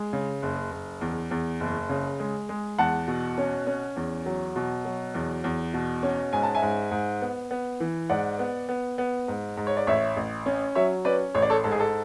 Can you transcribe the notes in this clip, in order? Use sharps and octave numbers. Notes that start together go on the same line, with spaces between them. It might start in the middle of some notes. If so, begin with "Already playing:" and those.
Already playing: G#3
C#3
F#1
F#1
E2
E2
F#1
C#3
G#3
G#3
E2 F#5 A5
B2
C#4
C#4
E2
F#3
B2
F#3
E2
E2
B2
C#4
G#2 G#5
A5
E5 G#5
G#2
G#2
B3
B3
E3
G#2 D5 F#5
B3
B3
B3
G#2
G#2
C#5
D5
A1 C#5 E5
A1
C#4
F#3 C#5 E5
C#4 B4 D5
A1 C#5
D5
A4 C#5
G#2 A4
G#4
A4